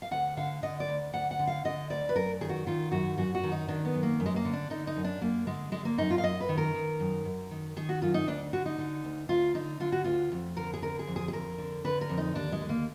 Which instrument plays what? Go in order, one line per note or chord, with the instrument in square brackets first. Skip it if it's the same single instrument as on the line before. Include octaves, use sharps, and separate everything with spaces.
[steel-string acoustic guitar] F5
D2 F#5
D3 F5
D3 D#5
D5
D2
D2 F#5
F#5
D3
F5
D3 D#5
D2 D5
B4
F#2 A#4
D#3 G#4
F#4
D#3 F4
F#2 F#4
F#2 F#4
F#4
D#3
D#4
D#3 D4
B3
F#2
A#3
F#2
G#3
A#3
D3
D4
D3 D#4
D#4
F#2
D4
F#2 A#3
D3 G#3
D3 G#3
A#3
F#2 D#4
F4
F5
F#2 D#5
B4
D#3
A#4
D#3
F#2
F#2
D#3
D#3 G#4
F#4
F#2 F4
D#4
D2 D4
D3 F#4
D#4
D3
D2
D2 F4
D3 D#4
D3 F4
F#4
D2 F4
F2
D3 A#4
G#4
D3 A#4
G#4
F2
G#4
G#4
F2 A#4
D3
D3 B4
A#4
F2
D#4
D#2 D4
G#3
D3
A#3